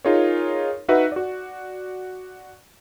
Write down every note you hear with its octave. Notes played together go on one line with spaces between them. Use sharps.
D#4 F4 G#4 A#4 C#5
D#4 F#4 B4 E5 F#5
F#4 D5